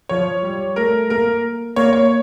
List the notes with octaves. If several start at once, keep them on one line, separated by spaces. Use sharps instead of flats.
F3 C#5
G3
A3 A#4
A#3 A#4
A#3 C#5
C#5